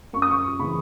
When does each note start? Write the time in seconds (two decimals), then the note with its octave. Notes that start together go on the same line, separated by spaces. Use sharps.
0.13 F#2 C#6
0.22 D#6
0.31 C#6
0.59 C#3 E3 B5